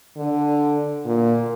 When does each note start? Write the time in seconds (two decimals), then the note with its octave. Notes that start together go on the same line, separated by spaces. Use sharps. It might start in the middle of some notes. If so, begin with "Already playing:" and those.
0.17 D3
1.05 A#2